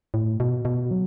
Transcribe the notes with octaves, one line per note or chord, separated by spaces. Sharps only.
A2
B2
B2
F#3